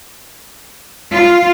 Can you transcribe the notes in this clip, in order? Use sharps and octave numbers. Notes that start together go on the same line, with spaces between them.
F4